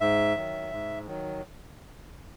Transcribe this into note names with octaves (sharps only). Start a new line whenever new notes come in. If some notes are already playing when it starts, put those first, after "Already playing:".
G#2 E5
D#3 F#3
G#2
D#3 F#3